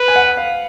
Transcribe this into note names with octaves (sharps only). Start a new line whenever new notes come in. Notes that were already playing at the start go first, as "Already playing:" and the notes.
Already playing: B4
G#5
F#5
F5